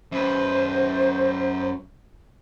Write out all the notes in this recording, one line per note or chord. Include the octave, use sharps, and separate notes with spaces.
F#2 B4 C5